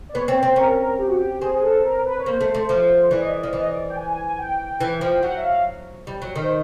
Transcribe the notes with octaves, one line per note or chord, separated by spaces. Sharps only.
D5
B3 C#5
C4 C#5
C5
C4
C#4 A#4
A#4
G4
F#4
G4
C4 G#4
G#4
A4
A#4
B4
C#5
A#3 C5
A3
A3
F3
E3 D5
D#5
D5
D#5
F3
E3 D5
D#5
D5
G5
G#5
G#5
G#5
G5
E3
F3
G5
F#3 F#5
E5
F5
G3
F#3
D#3
C5